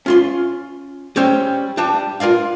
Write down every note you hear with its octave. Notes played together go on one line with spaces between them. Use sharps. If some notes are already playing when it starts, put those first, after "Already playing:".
C#4 F4 C6
G3 C4 C#4 C5
G3 D4 A5
F4 A#4 D5 F5